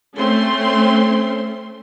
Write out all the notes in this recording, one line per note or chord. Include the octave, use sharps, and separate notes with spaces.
A3 C4 C#4 C6